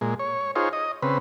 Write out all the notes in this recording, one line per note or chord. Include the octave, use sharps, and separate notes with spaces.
A#2 G#3
C#5
D#4 F4 G#4 C5 C#5
D#5
C#3 C4 B4